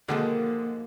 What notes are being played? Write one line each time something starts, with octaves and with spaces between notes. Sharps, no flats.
B2 D3 D#3 F3 F#3 G#3 A#3